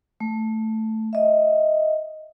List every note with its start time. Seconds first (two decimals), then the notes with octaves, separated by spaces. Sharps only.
0.20 A3
1.13 D#5 E5